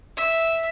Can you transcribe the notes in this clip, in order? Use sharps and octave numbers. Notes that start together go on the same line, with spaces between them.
E5